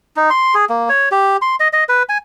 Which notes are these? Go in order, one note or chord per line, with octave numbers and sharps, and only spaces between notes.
D#4
C6
G#4
A#3
C#5
G4
C6
D#5
D#5
B4
G#5